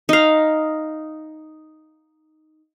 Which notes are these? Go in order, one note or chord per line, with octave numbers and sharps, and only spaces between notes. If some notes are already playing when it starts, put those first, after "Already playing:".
D#4 F5